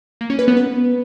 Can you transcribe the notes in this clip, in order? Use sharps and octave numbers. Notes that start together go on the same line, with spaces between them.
A#3
C#4
B4
B3
B4